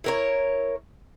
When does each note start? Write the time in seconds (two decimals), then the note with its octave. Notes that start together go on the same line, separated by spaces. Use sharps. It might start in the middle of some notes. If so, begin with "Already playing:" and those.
0.04 E4 A#4 C#5